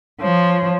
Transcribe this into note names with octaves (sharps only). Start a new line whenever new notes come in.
F3 C#5